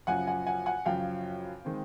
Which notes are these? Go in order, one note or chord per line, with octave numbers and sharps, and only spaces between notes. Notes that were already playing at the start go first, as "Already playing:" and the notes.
F#2 C#3 F3 F#5 G#5
F#5 G#5
F#5 G#5
F#5 G#5
F#2 C#3 F3 F5 G5
D#3 G#3 C4